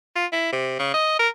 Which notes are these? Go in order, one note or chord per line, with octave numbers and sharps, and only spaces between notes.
F4
E4
C3
C#3
D#5
A#4